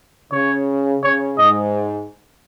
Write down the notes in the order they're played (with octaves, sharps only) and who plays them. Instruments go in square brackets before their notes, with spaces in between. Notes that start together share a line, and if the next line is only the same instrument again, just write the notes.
[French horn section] C#3 [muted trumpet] C#5
[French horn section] C#3 [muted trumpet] C#5
[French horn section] G#2 [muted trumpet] D#5